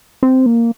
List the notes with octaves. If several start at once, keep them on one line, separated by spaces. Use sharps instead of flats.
C4
A#3